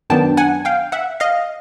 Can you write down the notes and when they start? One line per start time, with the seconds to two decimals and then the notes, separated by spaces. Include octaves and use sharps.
0.10 F#2 D#3 F#3 B3 D4 G5 A5
0.37 F#5 G#5
0.65 F5 G5
0.92 E5 F#5
1.20 D#5 F5